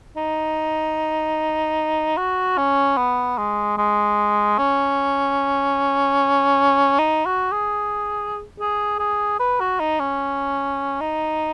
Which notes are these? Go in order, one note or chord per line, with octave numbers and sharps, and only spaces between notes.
D#4
F#4
C#4
B3
G#3
G#3
C#4
D#4
F#4
G#4
G#4
G#4
B4
F#4
D#4
C#4
D#4